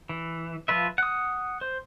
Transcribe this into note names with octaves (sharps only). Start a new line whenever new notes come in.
E3
F3 F4 B4 E5
F#5 D#6
C5